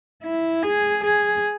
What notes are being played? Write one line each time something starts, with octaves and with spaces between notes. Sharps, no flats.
E4
G#4
G#4